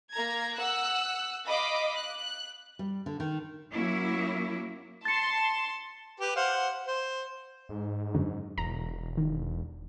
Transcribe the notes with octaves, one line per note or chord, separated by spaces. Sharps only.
A#3 A#5 G#6
F#5 E6 F#6
D#5 F5 B5 D6
F#6
G3
D3
D#3
F#3 A#3 C#4 E4 E5
A5 C6 A6 C#7
G4 B4
C5 F5 F#5
C5
G#2
F#2 D3 F#3
E1 A#5
D#3